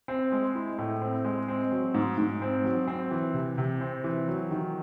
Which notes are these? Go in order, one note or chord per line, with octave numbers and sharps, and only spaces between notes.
C4
G#3
E4
A2
C4
G#3
C4
F#3
G#2
G#2
C4
F#3
C4
E3
C3
C3
C4
E3
F#3
D#3